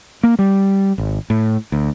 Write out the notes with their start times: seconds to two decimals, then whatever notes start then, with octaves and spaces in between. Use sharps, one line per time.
0.23 A#3
0.39 G3
0.98 G#1
1.30 A2
1.72 D2